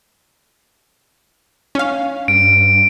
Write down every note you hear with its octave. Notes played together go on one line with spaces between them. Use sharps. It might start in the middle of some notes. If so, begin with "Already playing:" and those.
C#4 F5
G2 D7